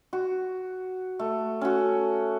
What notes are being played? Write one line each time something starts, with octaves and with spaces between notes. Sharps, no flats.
F#4
A3
C#4 F#4